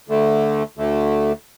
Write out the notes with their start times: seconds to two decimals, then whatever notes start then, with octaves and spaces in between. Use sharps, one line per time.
0.08 D2 D3 A3
0.77 D2 D3 A3